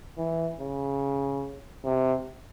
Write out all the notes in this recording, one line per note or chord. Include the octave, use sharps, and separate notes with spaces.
E3
C#3
C3